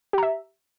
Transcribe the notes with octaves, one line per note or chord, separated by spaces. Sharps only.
G4 E5 A#5